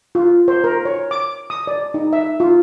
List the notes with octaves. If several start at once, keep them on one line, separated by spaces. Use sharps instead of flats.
F4
C5
A#4
C#5
D6
D#6
D5
D#4
E5
F4